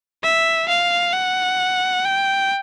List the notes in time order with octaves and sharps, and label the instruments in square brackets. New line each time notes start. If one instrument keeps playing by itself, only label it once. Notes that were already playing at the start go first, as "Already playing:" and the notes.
[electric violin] E5
F5
F#5
G5